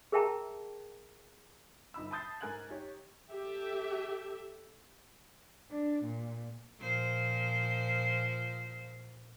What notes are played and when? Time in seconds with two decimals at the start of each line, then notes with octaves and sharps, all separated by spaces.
0.12 G#4 A#4 E5 G5 A5 A#5
1.94 G1 D#4 B5 E6
2.11 A5 B5 D#6 G6 A6 C7
2.41 G#2 A#4 G#5 F#6 G#6 F#7
2.69 D#4 G4 C#5
3.31 G4 A4 E5
5.72 D4
6.04 A#2
6.80 A#2 F3 C5